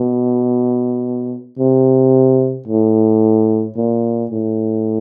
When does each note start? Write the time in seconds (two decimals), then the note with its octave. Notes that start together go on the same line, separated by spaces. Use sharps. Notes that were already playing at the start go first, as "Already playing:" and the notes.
Already playing: B2
1.59 C3
2.68 A2
3.77 A#2
4.31 A2